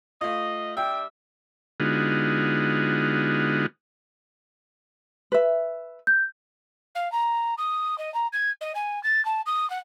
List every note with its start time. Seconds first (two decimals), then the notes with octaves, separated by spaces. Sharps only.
0.21 A3 F4 D#5
0.77 G3 D4 E5 G5
1.80 D3 G#3 B3 D#4 F4 F#4
5.32 B4 E5
6.07 G6
6.95 F5
7.12 A#5
7.58 D#6
7.98 D#5
8.14 A#5
8.33 G#6
8.61 D#5
8.75 G#5
9.03 A6
9.25 A5
9.46 D#6
9.70 F#5